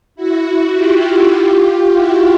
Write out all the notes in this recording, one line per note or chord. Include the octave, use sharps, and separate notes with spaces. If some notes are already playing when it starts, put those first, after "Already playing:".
E4 F#4
F4 G4
E4 F#4